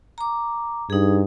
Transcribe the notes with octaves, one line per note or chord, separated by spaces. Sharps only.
A#5 D6
G2 D#4 G#4